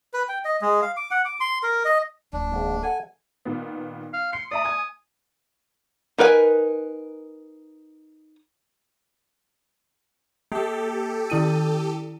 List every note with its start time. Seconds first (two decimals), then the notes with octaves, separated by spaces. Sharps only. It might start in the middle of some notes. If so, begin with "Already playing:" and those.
0.14 B4
0.29 G5
0.45 D#5
0.62 G#3
0.82 F5
0.97 D6
1.11 F#5
1.25 D6
1.40 C6
1.63 A#4
1.85 D#5
2.33 D1 A#3 D4
2.52 G#1 G#2
2.83 A4 F#5 G#5
3.45 A#2 D#3 B3
4.13 F5
4.33 C6 C#7
4.51 D5 E5 A#5 D#6
4.65 G#5 G#6
6.18 D#4 A#4 B4 F5 G#5
10.52 A#3 G4 A4
11.30 D#3 E4 D#7